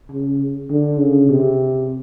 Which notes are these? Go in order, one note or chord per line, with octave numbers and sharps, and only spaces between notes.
C#3
D3
C#3
C3